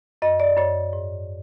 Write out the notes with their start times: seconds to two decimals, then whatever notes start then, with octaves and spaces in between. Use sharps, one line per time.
0.22 F#2 D#5
0.40 D5
0.57 F#2 C#5
0.93 G#2